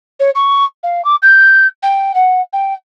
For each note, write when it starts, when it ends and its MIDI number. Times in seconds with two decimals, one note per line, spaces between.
0.19 0.30 73
0.35 0.64 85
0.83 1.04 77
1.04 1.15 86
1.22 1.67 91
1.83 2.12 79
2.14 2.41 78
2.53 2.73 79